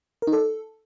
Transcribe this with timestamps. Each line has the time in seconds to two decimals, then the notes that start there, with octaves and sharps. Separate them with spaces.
0.22 A#4
0.27 D#4
0.32 A4